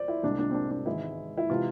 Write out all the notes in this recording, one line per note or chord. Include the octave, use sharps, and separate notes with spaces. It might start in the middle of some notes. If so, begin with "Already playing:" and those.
Already playing: C5 D5
E4
C2 C3 G#3 D4
D4
C4
D4
D4
G#1 G#2 E3 G#3 E4
E4
C3 E3 G#3 F4